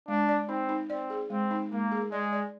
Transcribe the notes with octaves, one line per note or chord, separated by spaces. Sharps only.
G#3 D4
D5
C4 D#4
D#4
C4 D5
G#4
G#3 C4
D#4
G#3 A#3
G#4
G#3 D5
D5